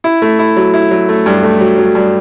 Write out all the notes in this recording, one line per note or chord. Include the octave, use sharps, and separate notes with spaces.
E4
A3
E4
F#3
E4
F#3
A3
G2
A3
F#3
F#3
G2